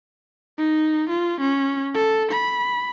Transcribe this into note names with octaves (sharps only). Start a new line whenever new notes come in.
D#4
F4
C#4
A4
B5